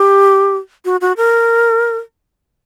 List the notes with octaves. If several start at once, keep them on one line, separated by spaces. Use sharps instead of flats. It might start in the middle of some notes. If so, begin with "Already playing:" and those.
Already playing: G4
F#4
F#4
A#4